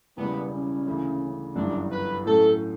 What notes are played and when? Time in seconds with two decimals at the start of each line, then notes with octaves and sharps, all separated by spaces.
0.17 E1 E2 C#3 G3 B3
0.52 C#4
0.86 D2 C#3 E3
1.55 G1 F#2 E3 G3 D4
1.90 B4
2.25 A2 F#3 A3 C#4 A4